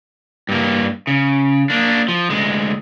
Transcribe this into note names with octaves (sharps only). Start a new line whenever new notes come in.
G2 A#3
C#3
A#3 D4
F3
D2 G#3